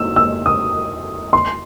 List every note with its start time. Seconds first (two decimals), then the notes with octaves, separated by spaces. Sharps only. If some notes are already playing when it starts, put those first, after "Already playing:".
Already playing: E6
0.16 E6
0.46 D#6
1.33 C6